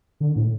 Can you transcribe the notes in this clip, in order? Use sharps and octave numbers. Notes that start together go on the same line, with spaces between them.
D3
A2